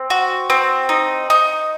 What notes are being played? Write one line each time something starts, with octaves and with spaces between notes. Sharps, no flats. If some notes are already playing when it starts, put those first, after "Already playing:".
Already playing: C4
F#4
C4
D#4
D#4